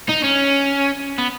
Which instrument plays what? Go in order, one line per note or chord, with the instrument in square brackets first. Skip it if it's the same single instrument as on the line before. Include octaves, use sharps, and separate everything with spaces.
[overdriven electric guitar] D#4
C#4
B3